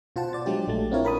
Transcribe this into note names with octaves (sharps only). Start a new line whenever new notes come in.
B2 F4 C5 F#5 A5
D5 A6
F#3 G#3 D4 G4
A#1 A3 A6
C4 D4 E4 F4 A#4 C#5
A#4 B5 D#6